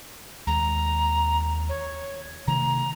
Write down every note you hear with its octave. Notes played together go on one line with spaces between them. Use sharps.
D#2 G#3 A#5
C#5
C3 D#3 A3 A#5